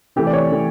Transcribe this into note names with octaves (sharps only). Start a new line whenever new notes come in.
C3 E3 A3 G4
D5
C#5
C3 E3 A3